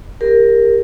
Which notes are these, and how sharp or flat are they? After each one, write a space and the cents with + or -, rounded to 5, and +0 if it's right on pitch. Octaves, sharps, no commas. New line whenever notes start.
G4 +25 A#4 +0